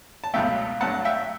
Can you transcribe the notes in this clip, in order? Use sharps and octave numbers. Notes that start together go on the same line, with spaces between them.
A5
C#2 B2 F#3 A3 E5 G5
G2 F#3 A3 F#5 A5
E5 G5